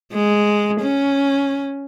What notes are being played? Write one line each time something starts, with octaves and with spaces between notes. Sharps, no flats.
G#3
C#4